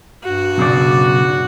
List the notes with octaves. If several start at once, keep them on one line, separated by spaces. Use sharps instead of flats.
G2 F#4
B1 C#3 D5